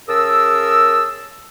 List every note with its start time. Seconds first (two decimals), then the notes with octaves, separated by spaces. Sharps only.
0.09 C#3 G#4 A#4 A5 D#6 E6